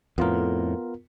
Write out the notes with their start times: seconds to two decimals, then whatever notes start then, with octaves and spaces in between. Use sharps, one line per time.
0.18 F2 A2 B3 F4 A#4